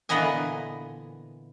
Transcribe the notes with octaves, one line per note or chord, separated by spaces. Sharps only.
A#2 D3 E3 B3 D#5 G#5